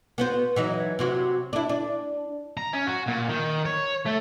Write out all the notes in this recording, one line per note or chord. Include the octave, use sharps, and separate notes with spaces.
B3 F#4 C5
E3 F#3 D#4
C3 F#3 F#4
D4 E4
D4
A#5
C#4
F#4
A#2
D#3
C#5
A3